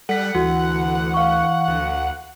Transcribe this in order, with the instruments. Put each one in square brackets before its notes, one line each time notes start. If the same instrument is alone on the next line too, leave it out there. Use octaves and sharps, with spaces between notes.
[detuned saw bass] G3 [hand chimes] A4 B6 [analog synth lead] F#5
[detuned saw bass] D2 [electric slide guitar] E3 [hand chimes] F#4
[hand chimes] F5 C#6
[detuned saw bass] D2